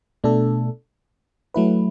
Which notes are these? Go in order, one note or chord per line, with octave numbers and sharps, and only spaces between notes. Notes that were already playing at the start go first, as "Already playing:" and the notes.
B2 A3 D4 A4
F#3 A3 E4 B4